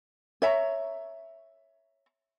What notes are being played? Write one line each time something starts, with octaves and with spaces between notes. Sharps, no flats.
C#5 E5 A#5